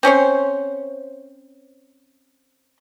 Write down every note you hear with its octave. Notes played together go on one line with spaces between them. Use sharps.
C4 C#4 C5 C#5